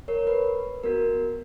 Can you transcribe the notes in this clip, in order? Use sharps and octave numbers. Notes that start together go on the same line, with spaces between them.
A#4 C#5
B4
B3 F#4 A#4